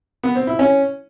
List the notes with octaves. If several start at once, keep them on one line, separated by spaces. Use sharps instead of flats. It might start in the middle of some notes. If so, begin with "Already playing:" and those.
B3
C4
E4
C#4